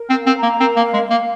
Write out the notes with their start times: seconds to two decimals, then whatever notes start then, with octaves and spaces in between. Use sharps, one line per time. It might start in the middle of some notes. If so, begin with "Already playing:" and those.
Already playing: A#4
0.10 C4
0.15 F5
0.26 C4
0.37 A#5
0.43 A#3
0.60 C4 A#4
0.76 A#3
0.82 F5
0.93 G#3
1.05 F5
1.11 A#3